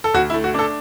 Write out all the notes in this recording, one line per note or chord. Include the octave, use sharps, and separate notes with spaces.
A4
D2 F#4
E4
A3
F#4
D4 A4